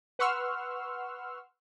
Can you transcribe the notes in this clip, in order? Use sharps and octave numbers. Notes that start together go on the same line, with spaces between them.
B4 F#5 C6 C#6 E6 F6